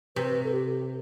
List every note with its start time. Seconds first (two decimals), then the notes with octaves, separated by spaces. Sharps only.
0.16 C3 B4
0.44 A4
0.52 G4